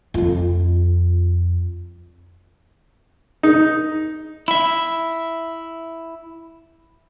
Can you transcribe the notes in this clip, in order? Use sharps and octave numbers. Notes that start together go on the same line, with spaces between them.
F2 F4
D#4
E4 E5